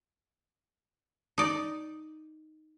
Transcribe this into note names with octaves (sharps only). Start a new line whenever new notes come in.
D#4 D5